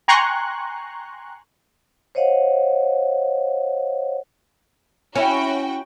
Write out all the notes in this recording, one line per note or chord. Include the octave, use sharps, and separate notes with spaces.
G5 G#5 A#5 C6 C#6 F#6
C5 C#5 D#5 F5 F#5
C#4 E4 F#4 G5